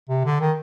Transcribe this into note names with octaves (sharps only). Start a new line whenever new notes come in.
C3
D3
D#3